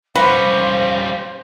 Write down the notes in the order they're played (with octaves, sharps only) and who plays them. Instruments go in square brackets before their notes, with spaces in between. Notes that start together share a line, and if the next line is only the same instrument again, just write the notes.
[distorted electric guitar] G3 C#4 [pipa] B4 F#5 A#5 [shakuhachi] C5 [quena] F5